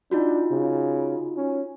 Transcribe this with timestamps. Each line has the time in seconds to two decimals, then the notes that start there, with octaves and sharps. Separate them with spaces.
0.11 D4 D#4 F4 F#4
0.51 C#3
1.37 C#4